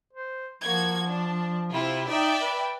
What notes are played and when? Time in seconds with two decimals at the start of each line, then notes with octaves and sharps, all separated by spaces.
0.13 C5
0.62 F3 A#3 F#4 G#6
1.08 D4
1.72 C3 C4 E4 F4
2.08 D#4 D5 E5 G5
2.41 B4